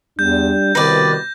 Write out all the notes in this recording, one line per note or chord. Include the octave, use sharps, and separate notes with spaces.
E2 G3 D4 G6
C2 B2 D#3 B4 D5 G6 A#6